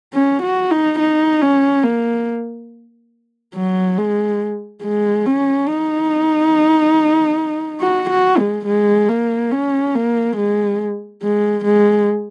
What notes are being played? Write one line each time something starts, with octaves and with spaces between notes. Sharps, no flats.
C#4
F#4
D#4
D#4
C#4
A#3
F#3
G#3
G#3
C#4
D#4
F#4
F#4
G#3
G#3
A#3
C#4
A#3
G#3
G#3
G#3